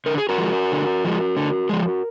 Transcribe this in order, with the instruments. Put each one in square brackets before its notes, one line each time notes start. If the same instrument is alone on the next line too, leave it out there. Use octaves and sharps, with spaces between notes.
[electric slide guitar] D3 A#4
G#4
F#4 A#4
F3 G#3
D3
F3 G#3
D3
F3 G#3